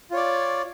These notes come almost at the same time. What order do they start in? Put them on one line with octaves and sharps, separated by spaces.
F4 C#5 D5